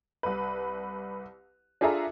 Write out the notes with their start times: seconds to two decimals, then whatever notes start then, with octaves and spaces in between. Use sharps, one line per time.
0.23 C2 B4
1.81 D4 F4 G#4 A4 E5 A#5